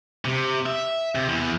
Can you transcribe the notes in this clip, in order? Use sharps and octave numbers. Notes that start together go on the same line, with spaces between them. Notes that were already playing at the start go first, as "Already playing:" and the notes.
C3
E5
C3
E2